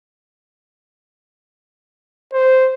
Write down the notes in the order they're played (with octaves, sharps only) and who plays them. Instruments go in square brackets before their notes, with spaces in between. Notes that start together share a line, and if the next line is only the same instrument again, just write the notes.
[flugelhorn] C5